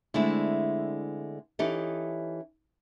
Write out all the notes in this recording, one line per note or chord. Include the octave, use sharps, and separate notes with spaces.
D3 G#3 A3 C4 D4 E4
E3 C#4 D#4 G4 A4